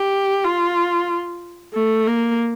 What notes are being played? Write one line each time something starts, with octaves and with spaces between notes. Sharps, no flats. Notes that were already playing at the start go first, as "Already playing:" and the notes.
Already playing: G4
F4
A3
A#3